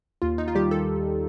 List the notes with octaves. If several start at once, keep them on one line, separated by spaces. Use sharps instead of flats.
D#2 F4
D#4
F4
D#3 G3 G4
A4